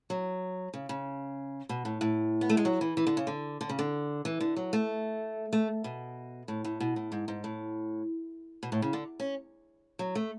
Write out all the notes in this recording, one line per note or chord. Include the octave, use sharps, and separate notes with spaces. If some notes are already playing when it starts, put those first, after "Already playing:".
F#3
C#3
C#3
B2
A2
A2
B3
A3
G#3
F#3
E3
E3
D3
C#3
D3
D3
C#3
D3
E3
D3
F#3
A3
A3
B2
A2
A2
B2
A2
G#2
G#2
A2
B2
A2
C#3
D3
C#4
F#3
A3